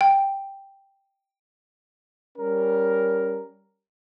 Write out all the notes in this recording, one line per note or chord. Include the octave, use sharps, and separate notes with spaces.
G5
G3 C#4 A#4